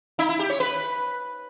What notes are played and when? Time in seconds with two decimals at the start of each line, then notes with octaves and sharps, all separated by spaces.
0.19 D#4
0.29 E4
0.39 G4
0.50 C#5
0.60 B4